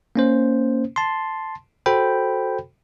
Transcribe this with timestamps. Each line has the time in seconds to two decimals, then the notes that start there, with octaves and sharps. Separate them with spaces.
0.16 A#3 C#4 C5
0.96 A5 C6
1.86 F#4 A4 C5 G5 B5